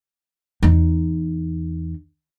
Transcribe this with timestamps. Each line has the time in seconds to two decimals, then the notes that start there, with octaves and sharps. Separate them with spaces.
0.63 E2 D#4